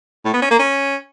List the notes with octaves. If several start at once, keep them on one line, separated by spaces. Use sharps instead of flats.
A2
B3
C#4
A#3
C#4